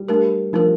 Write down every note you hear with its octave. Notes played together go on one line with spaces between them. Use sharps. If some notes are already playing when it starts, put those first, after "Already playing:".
Already playing: G3
A3 D4 G4 A#4
F3 A3 D4 G4 A#4